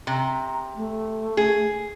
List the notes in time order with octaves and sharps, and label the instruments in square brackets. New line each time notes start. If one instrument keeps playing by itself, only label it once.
[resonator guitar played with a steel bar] C3 [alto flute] A#5
[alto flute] A3
[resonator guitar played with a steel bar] G#4